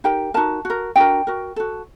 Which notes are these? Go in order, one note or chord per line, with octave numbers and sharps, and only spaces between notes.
D#4 G4 A#4 G5
D#4 F#4 A#4 A5
F#4 A#4
D4 F#4 A#4 G5
F#4 A#4
F#4 A4